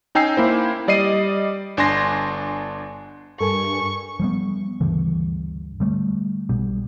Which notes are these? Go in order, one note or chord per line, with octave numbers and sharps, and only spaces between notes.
C#4 D#4 G5 G#5 E6 C7
A#3 E4 C5
G3 D5 D#5 C7 D#7
G1 D4 G#5 C6 A#6 C7
G2 A4 A#4 G#5 C#6
F3 G3 B3
D2 G2 C#3 E3
D3 G3 A3
B1 B2 G3